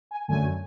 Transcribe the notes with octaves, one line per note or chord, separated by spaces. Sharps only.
G#5
F#2 D3 F#3 A3 G#5